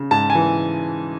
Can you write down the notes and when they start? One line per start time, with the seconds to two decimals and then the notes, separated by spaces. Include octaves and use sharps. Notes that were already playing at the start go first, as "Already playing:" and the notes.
Already playing: C#3
0.11 G#2 A5
0.30 G#5
0.35 E3